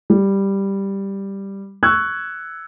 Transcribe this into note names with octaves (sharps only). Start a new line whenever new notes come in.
G3
C#6 E6 F#6 G#6